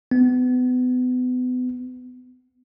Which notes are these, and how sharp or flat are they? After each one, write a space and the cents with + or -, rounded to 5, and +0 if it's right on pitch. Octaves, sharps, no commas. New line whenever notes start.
B3 +30